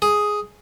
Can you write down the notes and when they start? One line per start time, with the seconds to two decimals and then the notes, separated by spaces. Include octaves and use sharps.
0.02 G#4